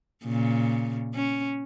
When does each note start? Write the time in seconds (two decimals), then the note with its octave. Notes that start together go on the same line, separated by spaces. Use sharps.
0.25 A#2 C#3
1.15 C#4